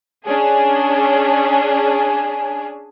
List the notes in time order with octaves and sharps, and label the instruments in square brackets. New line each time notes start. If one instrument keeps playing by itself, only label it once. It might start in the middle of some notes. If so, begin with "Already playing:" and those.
[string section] C#4 D4 G#4 [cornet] G#5